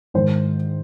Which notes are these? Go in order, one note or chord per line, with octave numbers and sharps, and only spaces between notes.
G#2 D#3 C5